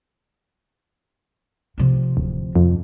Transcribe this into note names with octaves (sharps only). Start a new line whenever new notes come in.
C3 F3
D1
F2